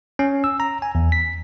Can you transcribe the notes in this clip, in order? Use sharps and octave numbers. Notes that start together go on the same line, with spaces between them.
C#4
E6
A#5
G#5
E2
B6